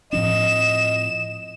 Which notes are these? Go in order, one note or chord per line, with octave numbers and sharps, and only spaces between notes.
A2 F3 C4 D#5 E7